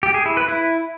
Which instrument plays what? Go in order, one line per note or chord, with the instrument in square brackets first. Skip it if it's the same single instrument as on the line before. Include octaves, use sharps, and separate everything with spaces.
[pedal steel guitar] G4
G#4
E4
B4
E4